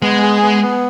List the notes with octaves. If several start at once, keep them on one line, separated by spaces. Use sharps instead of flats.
G#3 B3
G#4
B3
B3